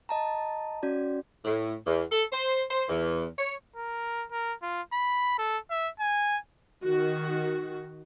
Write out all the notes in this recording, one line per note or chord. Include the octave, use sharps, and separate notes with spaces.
D#5 A5 A#5
C#4 F#4 D5
A2
E2
A4
C5
C5
E2
C#5
A#4
A#4
F4
B5
A4
E5
G#5
D#3 F#4